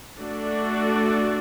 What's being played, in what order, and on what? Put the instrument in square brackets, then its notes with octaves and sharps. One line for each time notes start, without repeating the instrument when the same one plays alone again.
[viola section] A3 D4 F#4 A4 D5